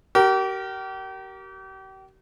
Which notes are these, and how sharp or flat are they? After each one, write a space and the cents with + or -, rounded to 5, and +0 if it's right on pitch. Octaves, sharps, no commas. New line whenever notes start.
G4 -40 A#4 +0